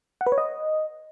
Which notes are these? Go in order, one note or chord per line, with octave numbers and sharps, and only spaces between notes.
F#5
B4
C#5
D#5